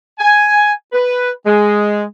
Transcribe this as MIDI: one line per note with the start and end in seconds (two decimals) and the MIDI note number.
0.19 0.71 80
0.92 1.29 71
1.46 2.03 56